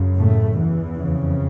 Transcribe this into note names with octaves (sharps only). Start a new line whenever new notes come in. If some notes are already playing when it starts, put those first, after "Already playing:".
Already playing: F#2 C#3
A2 A3
E2 E3
F2 C#3